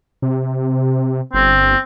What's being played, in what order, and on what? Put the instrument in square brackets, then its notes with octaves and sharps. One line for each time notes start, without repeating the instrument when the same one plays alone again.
[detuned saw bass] C3
[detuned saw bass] G1 [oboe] C4